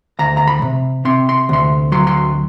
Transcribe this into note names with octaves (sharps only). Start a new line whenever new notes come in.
D2 A#5
A#5
B5
C3
C3 C6
C6
D2 C6
F#3 C6
C6